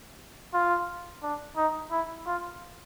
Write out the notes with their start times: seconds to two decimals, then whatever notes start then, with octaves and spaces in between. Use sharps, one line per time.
0.54 F4
1.23 D4
1.57 D#4
1.91 E4
2.26 F4